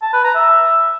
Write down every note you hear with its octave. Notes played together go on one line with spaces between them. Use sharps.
A5
B4
A#5
E5